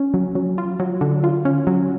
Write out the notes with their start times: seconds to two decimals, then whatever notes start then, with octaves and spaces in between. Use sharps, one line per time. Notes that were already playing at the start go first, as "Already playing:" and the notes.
Already playing: C#4
0.14 F#3
0.35 F#3
0.58 F4
0.80 F#3
1.01 D3
1.24 F4
1.45 C#4
1.67 F#3